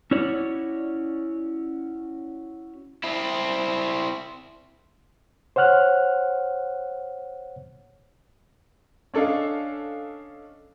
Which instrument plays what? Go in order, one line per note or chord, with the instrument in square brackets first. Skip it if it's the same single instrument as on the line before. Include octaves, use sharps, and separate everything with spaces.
[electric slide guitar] C#4 E4 F#4 C#5 D5
[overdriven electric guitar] C4 E4
[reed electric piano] C5 C#5 F#5 F6 F#6
[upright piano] C#4 D4 A4 D#5 F5